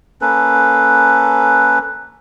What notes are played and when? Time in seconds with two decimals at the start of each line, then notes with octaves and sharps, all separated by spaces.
0.22 A#3 C#4 A4 B4